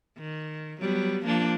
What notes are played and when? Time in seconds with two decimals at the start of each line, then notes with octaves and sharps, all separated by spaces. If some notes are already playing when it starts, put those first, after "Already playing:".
0.18 D#3
0.81 F#3 G3 B3
1.25 F3 A#3 D4